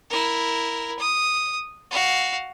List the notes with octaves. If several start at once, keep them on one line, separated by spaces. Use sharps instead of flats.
E4 A#4
D#6
F#4 F5